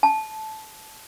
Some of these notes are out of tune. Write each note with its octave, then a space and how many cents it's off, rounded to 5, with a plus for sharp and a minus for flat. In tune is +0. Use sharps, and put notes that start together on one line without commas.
A5 -15